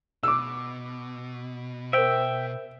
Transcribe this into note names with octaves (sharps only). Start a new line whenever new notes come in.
B2 D6 E6
A#4 C5 E5 G5